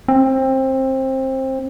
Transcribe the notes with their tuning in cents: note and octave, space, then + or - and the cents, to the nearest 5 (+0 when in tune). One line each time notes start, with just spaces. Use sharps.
C4 +20